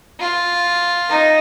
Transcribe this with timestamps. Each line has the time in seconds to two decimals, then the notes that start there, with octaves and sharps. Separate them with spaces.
0.20 F4
1.10 D#4